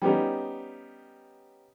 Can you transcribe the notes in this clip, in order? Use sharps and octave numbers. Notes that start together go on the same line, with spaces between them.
G3 B3 C#4 D#4